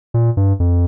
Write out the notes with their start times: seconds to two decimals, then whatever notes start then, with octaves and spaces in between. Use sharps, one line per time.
0.14 A#2
0.37 G2
0.60 F2